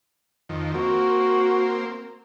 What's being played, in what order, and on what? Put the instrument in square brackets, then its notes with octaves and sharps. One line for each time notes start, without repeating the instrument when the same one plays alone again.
[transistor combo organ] F2 D#3
[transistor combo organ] A#3 C4 [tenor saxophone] F#4